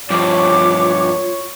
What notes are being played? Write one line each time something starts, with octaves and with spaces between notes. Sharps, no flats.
G2 F3 F4 C#5 D6